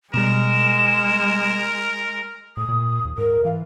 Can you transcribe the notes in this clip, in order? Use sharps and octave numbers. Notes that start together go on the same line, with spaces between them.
B2 G3 G#3 A#4 E7
A2 D#6
A#2
D#2
G#2 A#4
E3 F5